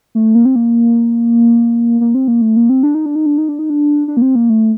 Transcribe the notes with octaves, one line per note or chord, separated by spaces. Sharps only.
A3
A#3
C4
A#3
A#3
C4
A#3
A3
A#3
C4
D4
D#4
D4
D#4
D4
D#4
D4
D#4
D4
D4
A#3
C4
A#3
A3